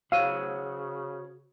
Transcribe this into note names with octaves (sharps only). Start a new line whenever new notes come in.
C#3 F#4 C5 C#5 F5 E6 D#7